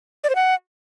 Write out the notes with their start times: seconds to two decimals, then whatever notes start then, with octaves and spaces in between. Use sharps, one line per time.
0.24 D5
0.30 C5
0.35 F#5